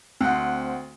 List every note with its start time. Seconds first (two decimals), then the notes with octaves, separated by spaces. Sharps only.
0.21 D2 C4 F#5